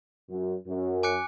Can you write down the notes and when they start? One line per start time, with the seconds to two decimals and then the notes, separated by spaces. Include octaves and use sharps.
0.29 F#2
0.67 F#2
1.03 G#5 D6 F#6 C#7